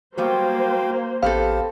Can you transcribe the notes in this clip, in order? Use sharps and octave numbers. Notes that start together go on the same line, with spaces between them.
F#3 G3 A#3 B3 F#4 C5 F5 G5
A1 B3 C4 G4 A4 C5 F5